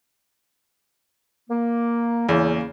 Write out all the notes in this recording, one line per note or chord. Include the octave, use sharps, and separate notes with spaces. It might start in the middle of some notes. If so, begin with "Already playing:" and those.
A#3
E2 C#3 A#3